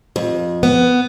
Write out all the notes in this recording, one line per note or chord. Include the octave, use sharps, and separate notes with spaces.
F2
B3